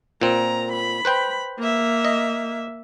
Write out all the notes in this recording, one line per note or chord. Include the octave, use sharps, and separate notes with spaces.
A#2 C4 A#5
B5
B4 C5 G5
A#3 E5
D#5